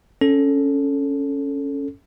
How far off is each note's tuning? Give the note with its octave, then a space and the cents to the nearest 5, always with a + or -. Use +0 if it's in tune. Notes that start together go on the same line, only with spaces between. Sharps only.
C#4 +0 A4 +0